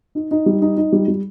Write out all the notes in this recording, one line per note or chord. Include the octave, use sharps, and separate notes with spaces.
D#4
D#4
G3
D#4
D#4
G3
G3